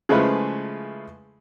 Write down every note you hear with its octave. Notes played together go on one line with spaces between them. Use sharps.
C#3 F3 G#3 A3 E4 B4